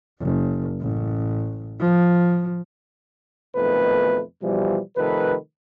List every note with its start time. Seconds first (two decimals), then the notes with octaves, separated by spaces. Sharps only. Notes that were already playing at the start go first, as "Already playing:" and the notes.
0.21 F#1
0.82 A1
1.80 F3
3.56 B1 F2 B2 D#3 A3 B4
4.43 B2 E3 F3 G3
4.97 C3 D#3 F3 A3 B4